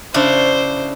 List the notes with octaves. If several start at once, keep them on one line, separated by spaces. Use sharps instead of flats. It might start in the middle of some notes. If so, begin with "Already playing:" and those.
C#3 D4 E4 C5